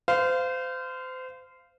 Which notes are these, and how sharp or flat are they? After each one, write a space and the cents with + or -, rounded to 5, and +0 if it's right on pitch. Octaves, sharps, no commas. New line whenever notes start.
C5 -30 F5 -10